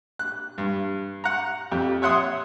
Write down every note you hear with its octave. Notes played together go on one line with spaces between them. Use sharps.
F#6
G2
F#5 A#5
F2 G4
C#5 E5 F#5 C6 D#6